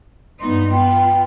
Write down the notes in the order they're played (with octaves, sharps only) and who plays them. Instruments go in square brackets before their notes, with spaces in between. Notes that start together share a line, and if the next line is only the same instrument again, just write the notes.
[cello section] G2 B3 D#4 [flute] C6
[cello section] B3 F4 [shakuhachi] G5